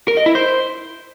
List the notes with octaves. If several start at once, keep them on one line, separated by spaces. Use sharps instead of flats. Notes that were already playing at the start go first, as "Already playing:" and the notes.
A#4
D#5
E4
C5